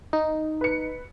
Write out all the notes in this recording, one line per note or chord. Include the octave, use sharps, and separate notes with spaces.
D#4
B4 C#7